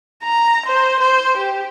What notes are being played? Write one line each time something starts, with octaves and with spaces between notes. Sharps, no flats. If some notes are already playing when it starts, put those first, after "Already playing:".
A#5
C5
C5
G4